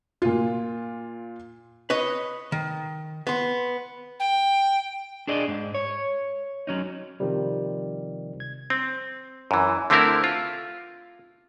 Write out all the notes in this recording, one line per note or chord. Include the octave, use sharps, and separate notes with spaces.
A#2 F4
B4 C#5 D#5
D#3
B3 C6
G5
D4 G#4 D5 D#5
G#2
C#5
F#3 C#4 D#4
C3 D#3 F3 G3
G#6
C4
F#2 E3
D3 A3 C4 E4 A#4
F4